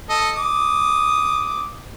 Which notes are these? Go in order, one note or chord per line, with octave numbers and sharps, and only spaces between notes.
A4 D#5
D6 D#6